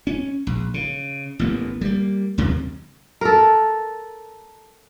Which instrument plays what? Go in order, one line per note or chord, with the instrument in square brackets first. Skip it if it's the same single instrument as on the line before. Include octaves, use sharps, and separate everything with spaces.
[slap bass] C#4
A#1
C#3
A1 D2 A#3 B3
G3 A#3
D#2 C3 F#3 A#3
[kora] A4 A#4